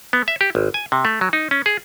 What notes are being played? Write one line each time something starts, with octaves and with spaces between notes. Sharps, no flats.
B3
E5
G4
G#1
G#5
C3
A3
F#3
D#4
C#4
G#4